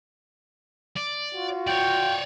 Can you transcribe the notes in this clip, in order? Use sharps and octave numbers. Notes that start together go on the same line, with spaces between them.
D5
F4 F#4
C#5 D5 G5